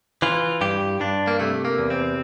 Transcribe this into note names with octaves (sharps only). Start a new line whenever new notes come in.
E3 F4
G2 G4
G2 D4
A#3
C3 A3
A#3
E2
C4